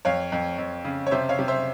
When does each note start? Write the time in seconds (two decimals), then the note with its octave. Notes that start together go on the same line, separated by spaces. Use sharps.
0.05 F2 C#5 F5
0.32 F2
0.58 F2
0.85 C#3
1.07 C#5
1.11 C3 C5 E5
1.29 C#5 F5
1.39 C3
1.48 C5 E5